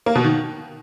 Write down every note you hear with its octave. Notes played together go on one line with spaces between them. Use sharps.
A#3
B2
D#3